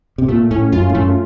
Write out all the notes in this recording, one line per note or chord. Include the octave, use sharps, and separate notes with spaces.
C3
A#2 A3
A2 C#4
F#2 F4
A2
F#2 A3